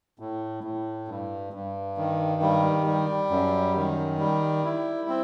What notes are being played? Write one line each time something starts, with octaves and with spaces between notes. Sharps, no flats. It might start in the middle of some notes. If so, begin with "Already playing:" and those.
A2
A2
G2
G2
D#3
G3
G3
F#2
D#3
G3
E4
C4